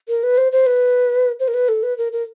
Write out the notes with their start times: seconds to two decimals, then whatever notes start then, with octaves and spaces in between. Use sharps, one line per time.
0.09 A#4
0.23 B4
0.38 C5
0.52 C5
0.66 B4
1.40 C5
1.48 A#4
1.54 B4
1.69 A4
1.83 B4
1.98 A#4
2.13 A#4